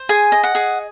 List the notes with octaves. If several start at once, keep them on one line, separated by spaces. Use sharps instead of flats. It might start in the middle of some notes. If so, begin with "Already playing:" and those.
Already playing: C5
G#4 G#5
D#5
F#5
G#4